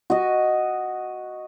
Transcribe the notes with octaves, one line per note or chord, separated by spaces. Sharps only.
F#4 D#5